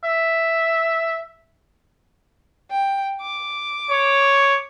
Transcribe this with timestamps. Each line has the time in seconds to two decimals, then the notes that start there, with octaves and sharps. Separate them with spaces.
0.04 E5
2.70 G5
3.21 D6
3.91 C#5